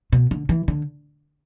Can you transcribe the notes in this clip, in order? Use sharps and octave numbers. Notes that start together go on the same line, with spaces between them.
B2
D3
E3
D3